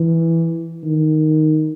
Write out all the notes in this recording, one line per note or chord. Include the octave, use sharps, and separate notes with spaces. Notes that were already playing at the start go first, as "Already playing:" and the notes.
Already playing: E3
D#3